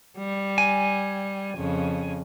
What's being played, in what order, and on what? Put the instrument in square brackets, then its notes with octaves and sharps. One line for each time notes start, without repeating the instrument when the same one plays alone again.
[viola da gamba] G3
[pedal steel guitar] G#5
[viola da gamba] F2 C#3